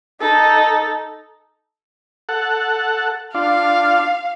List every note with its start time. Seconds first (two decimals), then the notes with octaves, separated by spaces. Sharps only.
0.21 D#4 A4
2.29 A4 F#5
3.34 D4 F4 F5